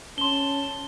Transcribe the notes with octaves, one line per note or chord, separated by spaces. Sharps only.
C#4 A5 C6 G7